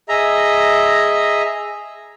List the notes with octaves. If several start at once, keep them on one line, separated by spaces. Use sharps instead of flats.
G#4 D#5 E5 A#5